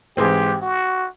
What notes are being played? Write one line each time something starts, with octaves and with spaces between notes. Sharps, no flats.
G#2 E3 G#3 C4 G4
F#4